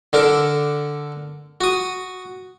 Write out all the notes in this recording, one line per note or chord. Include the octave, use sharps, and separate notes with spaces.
D3 D4 A4 A#4
F#4 D#6